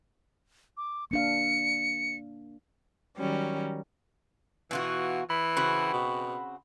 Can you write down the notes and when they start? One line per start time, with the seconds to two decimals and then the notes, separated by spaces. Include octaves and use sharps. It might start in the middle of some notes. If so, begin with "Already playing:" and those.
0.77 D6
1.11 A#3 D4 F5 C#7
3.17 D#3 F#3 G3 C#4
4.71 B2 E3 F4 F#4
5.30 E3 B5
5.57 C#3 C4 F#4 B5
5.93 B2